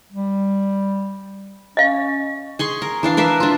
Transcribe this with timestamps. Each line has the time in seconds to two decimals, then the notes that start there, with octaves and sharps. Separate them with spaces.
0.12 G3
1.77 C#4 D#5 F5
2.59 G#4 C6 C#6
2.82 A#4
3.03 E3 D4 F5
3.17 A#4 B4 E5 F5
3.40 D4 F4